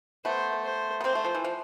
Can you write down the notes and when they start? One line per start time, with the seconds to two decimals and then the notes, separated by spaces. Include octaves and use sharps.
0.25 A3 B3 C5
0.64 C5
1.00 B3
1.04 A#3 C4 C5
1.15 A3
1.24 F3
1.35 E3
1.45 F3